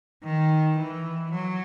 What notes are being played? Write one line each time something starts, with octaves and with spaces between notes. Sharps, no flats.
D#3
E3
F#3